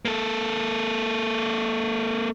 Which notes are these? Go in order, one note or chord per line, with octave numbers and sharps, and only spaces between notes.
A#3 A4